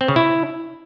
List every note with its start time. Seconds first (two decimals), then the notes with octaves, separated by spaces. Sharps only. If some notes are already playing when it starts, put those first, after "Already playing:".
0.01 C4
0.08 C#3
0.16 E4